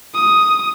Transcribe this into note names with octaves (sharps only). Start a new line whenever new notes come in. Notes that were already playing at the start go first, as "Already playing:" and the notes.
D#6